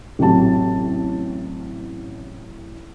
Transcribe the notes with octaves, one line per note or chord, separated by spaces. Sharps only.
A1 C3 F#3 A5